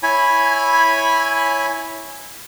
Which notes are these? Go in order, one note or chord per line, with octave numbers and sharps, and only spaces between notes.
E4 C#5 G#5 B5